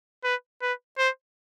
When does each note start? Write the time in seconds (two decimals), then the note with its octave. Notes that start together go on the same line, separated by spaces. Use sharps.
0.24 B4
0.62 B4
0.98 C5